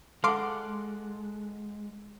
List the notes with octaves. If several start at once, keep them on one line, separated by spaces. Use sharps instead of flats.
G#3 A4 F5 F#5 C6 D6